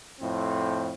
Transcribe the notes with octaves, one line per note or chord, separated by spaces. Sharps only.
F2 A2 C4